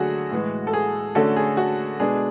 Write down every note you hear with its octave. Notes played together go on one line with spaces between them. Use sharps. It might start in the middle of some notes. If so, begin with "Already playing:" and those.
Already playing: D3 F#3 A3 F#4 G#4
A2 E3 G#3
A4
G#4
D3 A3 C#4 F#4 A4
G#4
F#4
B2 G#3 D4 G#4